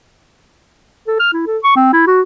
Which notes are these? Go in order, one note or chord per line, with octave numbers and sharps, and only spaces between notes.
A4
F6
E4
A4
C#6
C4
E4
F#4